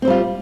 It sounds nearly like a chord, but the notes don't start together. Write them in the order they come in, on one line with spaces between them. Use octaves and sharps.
C4 C5 G3 F4